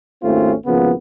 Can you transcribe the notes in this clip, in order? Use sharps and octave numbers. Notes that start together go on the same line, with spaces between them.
G#1 D#2 A3 C4 C#4 F4
G#1 C#3 F3 A#3 B3